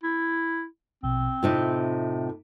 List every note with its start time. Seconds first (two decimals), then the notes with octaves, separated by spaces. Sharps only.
0.04 E4
1.03 A#1 B2 C4
1.43 A2 C3 D#4 F4